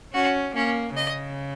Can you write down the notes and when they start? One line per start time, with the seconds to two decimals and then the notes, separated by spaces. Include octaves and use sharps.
0.14 C#4 F#4
0.55 A#3 C#4
0.96 C#3 D#5